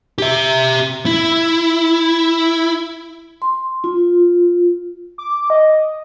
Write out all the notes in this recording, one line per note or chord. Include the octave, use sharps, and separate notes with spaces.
G4 E5
E4
C6
F4
D6
D#5